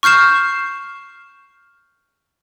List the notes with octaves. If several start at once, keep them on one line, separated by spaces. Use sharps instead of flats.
C#6 F6 G6 C7 E7